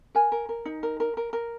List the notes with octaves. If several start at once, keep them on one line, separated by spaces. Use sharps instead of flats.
A#4 G#5
A#4
A#4
D#4
A#4
A#4
A#4
A#4